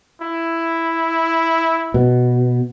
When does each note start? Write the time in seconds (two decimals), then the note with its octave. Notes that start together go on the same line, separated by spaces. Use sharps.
0.21 E4
1.94 B2